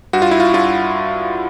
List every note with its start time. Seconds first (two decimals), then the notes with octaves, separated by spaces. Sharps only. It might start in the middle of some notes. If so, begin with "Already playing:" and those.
0.13 G2 F#4
0.22 F4
0.31 E4
0.40 F4
0.54 G2 F4